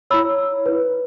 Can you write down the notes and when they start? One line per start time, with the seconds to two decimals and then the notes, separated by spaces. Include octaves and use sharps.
0.10 E4 C#5 B5 E6
0.66 E4 B4